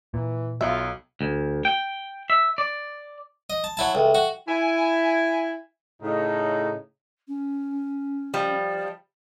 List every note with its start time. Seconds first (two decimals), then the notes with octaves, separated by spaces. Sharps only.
0.14 A#2 E3
0.61 B1 F#3 F4 E5
1.21 D2
1.65 G5
2.30 E5
2.58 D5
3.50 D#5
3.64 A5
3.77 F#3 E4 A5
3.95 C#2 A4 E5 G5
4.15 F#4
4.48 E4 G#5
6.02 A2 C#3 D#4
7.28 C#4
8.34 F3 G3